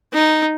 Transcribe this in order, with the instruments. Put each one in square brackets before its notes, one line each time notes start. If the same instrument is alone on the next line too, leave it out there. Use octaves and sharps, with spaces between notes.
[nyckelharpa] D#4